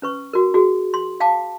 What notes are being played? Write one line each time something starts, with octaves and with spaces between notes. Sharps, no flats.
C#4 B4 C#6
F#4 A#4
F#4 G#4
C6
F5 G5 A5 D6